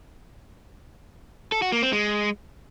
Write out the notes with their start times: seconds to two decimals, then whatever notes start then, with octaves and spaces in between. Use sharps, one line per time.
1.52 A4
1.62 F#4
1.72 A#3
1.82 C4
1.93 G#3